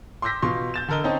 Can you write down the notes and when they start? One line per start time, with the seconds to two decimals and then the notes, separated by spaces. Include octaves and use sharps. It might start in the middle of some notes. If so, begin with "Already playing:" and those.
0.22 C6 D6 E6 G6 A#6 B6
0.42 B2 F4 C6 C#6
0.74 G6 A6 E7
0.88 D3 A4 A#4 D#5 G7
1.04 C4 C#4 D#4 C5 D#5 A5